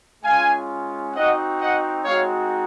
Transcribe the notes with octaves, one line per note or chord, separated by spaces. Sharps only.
G#3 C#4 F4 F5 G#5
C4 D#4 F#4 D#5 F#5
D#5 F#5
G#3 C4 D#4 F#4 C#5 F5